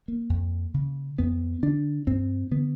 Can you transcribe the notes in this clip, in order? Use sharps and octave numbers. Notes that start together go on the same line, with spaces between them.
A#3
F2
C#3
F2 B3
D3 D4
G2 C4
D3 B3